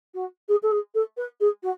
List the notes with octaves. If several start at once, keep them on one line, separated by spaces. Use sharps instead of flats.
F#4
G#4
A4
G#4
A4
B4
G#4
F#4